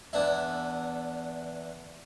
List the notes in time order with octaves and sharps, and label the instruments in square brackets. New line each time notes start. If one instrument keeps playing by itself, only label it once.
[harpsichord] E2 B3 D4 E4